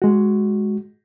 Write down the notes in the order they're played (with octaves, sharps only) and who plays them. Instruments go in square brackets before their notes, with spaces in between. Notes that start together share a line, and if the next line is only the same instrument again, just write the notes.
[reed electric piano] G#3 F#4